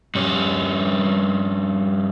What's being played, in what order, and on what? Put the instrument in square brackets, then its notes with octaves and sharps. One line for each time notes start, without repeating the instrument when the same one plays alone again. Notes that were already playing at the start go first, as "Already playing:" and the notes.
[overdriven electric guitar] G2 C#4